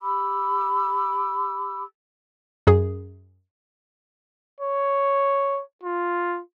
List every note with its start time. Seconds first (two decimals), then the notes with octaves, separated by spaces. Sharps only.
0.01 G4 B5 D6 E6
2.67 F#2 G#4
4.60 C#5
5.83 F4